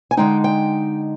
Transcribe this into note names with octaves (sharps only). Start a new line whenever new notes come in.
G#5
D3 G#3 D#4 G5
G5